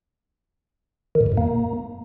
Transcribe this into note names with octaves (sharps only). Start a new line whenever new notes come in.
D#3
A#2
A2
F#2
A#3